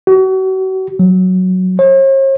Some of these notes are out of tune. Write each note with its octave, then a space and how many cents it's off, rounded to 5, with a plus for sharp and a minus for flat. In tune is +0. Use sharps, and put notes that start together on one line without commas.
F#4 +35
F#3 +0
C#5 -45